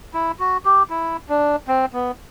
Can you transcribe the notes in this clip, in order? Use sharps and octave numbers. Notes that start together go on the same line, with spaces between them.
E4
F#4
G4
E4
D4
C4
B3